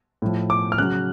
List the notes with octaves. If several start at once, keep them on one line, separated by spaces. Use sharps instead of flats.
A2 F3
D6
F6
C#3 F#3 F#6